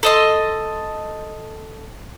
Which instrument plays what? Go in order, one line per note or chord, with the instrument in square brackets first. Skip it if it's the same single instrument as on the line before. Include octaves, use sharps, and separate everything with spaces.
[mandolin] A4 D#5 C6